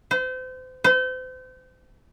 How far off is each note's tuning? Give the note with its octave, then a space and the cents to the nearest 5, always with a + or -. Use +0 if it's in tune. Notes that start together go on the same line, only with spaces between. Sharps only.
C5 -35
C5 -35